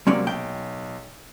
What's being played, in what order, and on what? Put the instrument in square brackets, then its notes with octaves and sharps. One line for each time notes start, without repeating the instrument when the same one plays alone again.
[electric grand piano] C3 F#3 A#3 [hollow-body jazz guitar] G#3 C#4 D5
[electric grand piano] B1 [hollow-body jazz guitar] G5